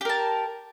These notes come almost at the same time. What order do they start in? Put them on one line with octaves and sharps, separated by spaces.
G4 A#4 A5